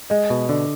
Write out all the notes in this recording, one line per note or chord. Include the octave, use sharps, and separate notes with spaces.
G#3 D#5
B2
D3 D5